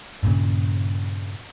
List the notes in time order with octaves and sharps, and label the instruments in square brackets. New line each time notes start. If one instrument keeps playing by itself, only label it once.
[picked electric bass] G2 A#2 C#3